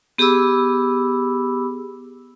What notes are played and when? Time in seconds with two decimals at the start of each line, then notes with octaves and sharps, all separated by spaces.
0.18 B3 G4 G#4 B5 D6 E6